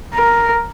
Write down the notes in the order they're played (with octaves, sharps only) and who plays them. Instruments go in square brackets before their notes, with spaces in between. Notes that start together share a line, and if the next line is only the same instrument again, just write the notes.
[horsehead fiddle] A#4